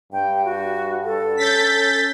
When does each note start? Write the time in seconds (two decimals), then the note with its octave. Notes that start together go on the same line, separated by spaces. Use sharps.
0.12 G2 G5
0.45 F#4
1.04 A4
1.37 C#4 G6 A6 B6